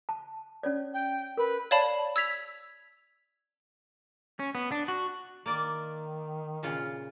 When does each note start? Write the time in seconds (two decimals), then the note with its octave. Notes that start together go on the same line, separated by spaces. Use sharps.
0.09 A5
0.63 C#4 C#5 D5
0.94 G5
1.37 A#4 B4
1.71 C#5 D5 F5 A5 B5
2.16 E6 G#6 B6 F7
4.39 C#4
4.55 B3
4.72 D4
4.88 F#4
5.46 D#3 A#3 D5
6.63 A#2 C#3 F4